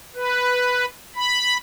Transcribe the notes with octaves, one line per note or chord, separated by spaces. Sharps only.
B4
B5